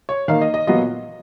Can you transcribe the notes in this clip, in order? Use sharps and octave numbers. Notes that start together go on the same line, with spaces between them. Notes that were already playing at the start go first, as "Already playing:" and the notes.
C#5
D#3 A#3 D#4 F5
D#5
D#5
A#2 F#3 B3 F4 D#5